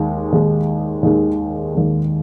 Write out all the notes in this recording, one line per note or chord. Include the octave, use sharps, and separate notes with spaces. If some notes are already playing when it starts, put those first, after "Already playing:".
Already playing: D#2 D#3 G#3
D#2 D#3 G#3
D#2 D#3 G#3
D#2 D#3 G#3